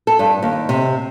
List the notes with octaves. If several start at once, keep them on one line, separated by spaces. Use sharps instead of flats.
A4
G2
D#2
C3